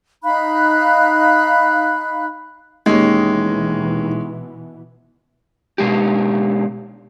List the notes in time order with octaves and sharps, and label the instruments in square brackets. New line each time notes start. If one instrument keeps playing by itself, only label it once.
[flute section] D#4 F5 B5 F#6
[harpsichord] D#2 [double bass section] B2 E3 [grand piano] G#3 C#4
[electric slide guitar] B2 G#3 A#3 G4